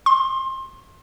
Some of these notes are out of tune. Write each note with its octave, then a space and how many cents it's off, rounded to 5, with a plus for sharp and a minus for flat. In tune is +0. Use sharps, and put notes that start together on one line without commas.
C6 +25